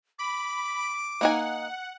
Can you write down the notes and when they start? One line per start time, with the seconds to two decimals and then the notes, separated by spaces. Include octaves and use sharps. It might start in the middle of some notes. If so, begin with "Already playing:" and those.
0.19 B5 D6
1.21 A#3 D#4 F#5 G#5